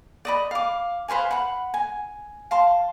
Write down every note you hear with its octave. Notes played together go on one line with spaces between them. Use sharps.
D5 D#5 B5
F5 D6
B4 C5 F5 G#5
F#5 B5
G#5
F5 A5 C6